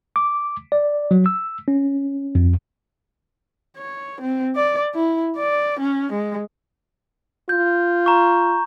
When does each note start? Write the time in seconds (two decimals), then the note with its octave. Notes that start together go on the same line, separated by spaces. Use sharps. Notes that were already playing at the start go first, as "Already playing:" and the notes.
0.16 D6
0.72 D5
1.11 F#3
1.26 E6
1.68 C#4
2.35 F2
3.77 C#5
4.21 C4
4.56 D5
4.95 E4
5.37 D5
5.79 C#4
6.13 G#3
7.49 F4 G6
8.06 A#5 C#6